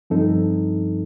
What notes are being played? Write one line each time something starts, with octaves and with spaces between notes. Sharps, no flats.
G2 F3 C4 D#4 A4